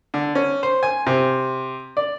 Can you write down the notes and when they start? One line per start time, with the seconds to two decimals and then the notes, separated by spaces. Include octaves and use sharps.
0.14 D3
0.35 C#4
0.63 C5
0.83 G#5
1.07 C3
1.97 D5